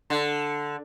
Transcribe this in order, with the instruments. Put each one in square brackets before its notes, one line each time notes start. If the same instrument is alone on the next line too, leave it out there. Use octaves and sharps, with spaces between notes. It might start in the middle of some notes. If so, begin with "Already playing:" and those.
[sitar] D3